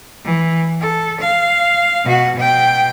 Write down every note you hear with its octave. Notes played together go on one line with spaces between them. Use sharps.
E3
A4
F5
B2 F#4
B2 G5